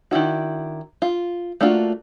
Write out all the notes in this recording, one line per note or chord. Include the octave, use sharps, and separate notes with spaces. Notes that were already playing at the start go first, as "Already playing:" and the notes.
D#3 D4 E4 F#4
F4
A3 A#3 D4 F4 F#4